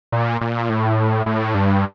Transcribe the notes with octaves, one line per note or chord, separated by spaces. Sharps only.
A#2
A#2
A2
A2
G2